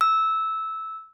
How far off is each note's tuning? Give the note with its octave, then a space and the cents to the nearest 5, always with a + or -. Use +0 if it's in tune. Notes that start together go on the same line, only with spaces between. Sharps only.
E6 -10